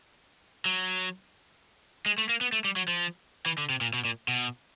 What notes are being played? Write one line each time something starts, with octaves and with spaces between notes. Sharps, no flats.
F#3
G#3
A3
A#3
B3
A3
G3
F#3
F3
E3
D3
C3
A#2
B2
A#2
B2